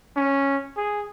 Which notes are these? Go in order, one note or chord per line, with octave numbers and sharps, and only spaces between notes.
C#4
G#4